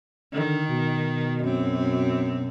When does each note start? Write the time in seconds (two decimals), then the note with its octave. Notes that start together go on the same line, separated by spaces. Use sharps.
0.33 D3 D#3
0.68 B2
1.44 F#2 C4